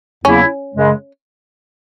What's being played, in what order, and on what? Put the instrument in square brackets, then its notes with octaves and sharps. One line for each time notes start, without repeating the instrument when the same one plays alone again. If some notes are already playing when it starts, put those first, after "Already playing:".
[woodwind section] E2 C#3 F#3 A#3 E4 [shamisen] C#4
[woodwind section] F#2 C#3 G#3